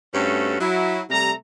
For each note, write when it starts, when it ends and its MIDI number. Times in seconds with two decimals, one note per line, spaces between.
0.14 0.55 43
0.14 0.55 57
0.14 0.55 60
0.14 0.55 61
0.14 0.55 66
0.14 0.55 69
0.60 1.01 54
0.60 1.01 64
1.10 1.33 48
1.10 1.33 55
1.10 1.33 57
1.10 1.33 82